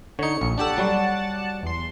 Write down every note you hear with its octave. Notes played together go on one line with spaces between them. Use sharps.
D3 D#4 C#5 C#7
A#1
D4 G4 A4 D5 F#5 A5
F#3 G3 F#4
E2 C6